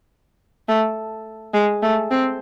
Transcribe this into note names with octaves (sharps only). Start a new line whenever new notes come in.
A3
G#3
A3
C4